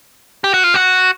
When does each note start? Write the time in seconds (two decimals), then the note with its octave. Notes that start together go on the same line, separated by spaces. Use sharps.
0.44 G4
0.54 F#4
0.64 F4
0.74 F#4